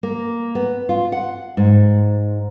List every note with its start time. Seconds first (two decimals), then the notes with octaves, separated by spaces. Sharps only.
0.03 A#3
0.55 B3
0.89 F4
1.12 F#5
1.57 G#2